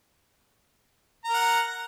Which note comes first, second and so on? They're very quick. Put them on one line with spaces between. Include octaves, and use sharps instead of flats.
A#5 A#4 F#5